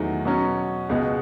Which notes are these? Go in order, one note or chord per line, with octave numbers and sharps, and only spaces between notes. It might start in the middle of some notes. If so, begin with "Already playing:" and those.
Already playing: E2 D#3 F#3 A3
B2 F#3 C#4
C#2 B2 G#3